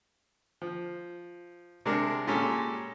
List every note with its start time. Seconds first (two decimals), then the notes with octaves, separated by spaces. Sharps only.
0.62 F3
1.86 C3 G#3 D4 A#4
2.27 A#2 G#3 C#4 G4 A4